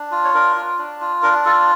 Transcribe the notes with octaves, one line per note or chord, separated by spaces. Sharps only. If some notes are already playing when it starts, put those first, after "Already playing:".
Already playing: D4
F4
C#5
D4 A#4
F4
D4
F4
D4 A#4
F4 A4